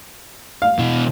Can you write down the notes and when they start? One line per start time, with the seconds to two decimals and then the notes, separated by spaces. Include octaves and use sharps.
0.62 F5
0.79 B2 E3